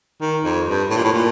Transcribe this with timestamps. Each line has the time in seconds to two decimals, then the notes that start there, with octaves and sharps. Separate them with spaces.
0.21 D#3
0.44 F2
0.67 G2
0.90 A2
0.97 A#2
1.04 A2
1.13 A#2